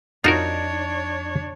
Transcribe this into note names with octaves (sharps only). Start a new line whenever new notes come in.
F2 D4 D#4 F4 F#4 A#4 C#5